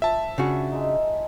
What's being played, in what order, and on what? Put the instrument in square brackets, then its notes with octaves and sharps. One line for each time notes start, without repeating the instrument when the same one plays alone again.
[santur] F3 [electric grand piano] E5 A5
[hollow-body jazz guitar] C#3 D4 F#4
[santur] G#3 D#4